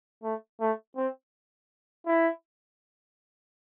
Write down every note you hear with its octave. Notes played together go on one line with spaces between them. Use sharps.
A3
A3
C4
E4